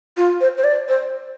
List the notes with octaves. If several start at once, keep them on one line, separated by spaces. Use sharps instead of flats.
F4
C5
C5
D5
C5